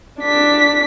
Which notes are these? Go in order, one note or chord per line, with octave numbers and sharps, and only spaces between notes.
D4 B6